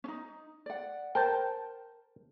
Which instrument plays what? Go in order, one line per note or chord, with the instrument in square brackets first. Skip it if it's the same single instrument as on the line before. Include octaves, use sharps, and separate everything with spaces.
[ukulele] C#4 D#4
D5 F#5
[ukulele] A#4 C5 [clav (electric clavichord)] G5 A5